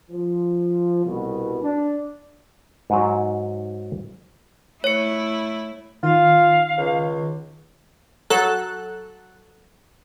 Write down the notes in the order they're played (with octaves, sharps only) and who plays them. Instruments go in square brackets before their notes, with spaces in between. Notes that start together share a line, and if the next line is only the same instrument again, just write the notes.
[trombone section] F3
C2 B2
D4
[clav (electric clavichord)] G#2 F#3
[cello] A3 E4 [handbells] C#5 C#7
[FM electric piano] D#3 [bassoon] F4 [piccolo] F5
[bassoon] C#2
[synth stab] F#3 A4 F#6